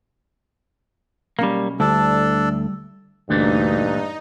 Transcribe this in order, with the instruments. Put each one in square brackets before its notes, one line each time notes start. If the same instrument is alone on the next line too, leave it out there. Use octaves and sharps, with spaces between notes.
[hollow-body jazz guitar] B1 C#4 [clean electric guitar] G3 A#3
[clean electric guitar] D2 [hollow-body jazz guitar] G3 E4 D5 [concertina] D4 A4
[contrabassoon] D2 [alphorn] G2 [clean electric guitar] A#2 E3 A3 [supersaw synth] D#4